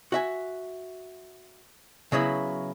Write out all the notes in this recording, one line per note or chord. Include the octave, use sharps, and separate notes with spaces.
F#4 E5 G#5
C#3 F#3 B3 E4